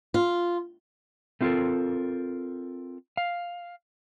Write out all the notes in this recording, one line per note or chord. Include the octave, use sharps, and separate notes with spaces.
F4
A3 C4 F4 F#4 A4 A#4
F5